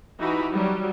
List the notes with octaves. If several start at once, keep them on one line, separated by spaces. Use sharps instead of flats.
E3 D#4 F#4 G4 B5
F#3 G3